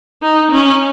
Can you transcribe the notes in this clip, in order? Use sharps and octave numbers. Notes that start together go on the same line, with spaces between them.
D#4
C#4